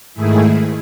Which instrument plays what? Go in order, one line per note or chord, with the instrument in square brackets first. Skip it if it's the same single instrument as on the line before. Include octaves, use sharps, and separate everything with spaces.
[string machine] G#2 D#3 A3 E4 G#4